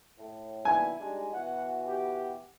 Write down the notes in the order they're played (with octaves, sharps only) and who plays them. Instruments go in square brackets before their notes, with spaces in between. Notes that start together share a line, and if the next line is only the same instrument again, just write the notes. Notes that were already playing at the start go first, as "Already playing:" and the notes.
[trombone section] A2
[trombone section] B2 D#3 D4 [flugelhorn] E4 [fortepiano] G#5
[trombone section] G3 G#3 D#4 [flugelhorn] D4
[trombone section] B2 E3 F#4 [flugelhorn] F#5
[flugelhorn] G4